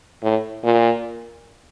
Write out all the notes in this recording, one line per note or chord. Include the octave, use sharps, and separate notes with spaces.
A2
A#2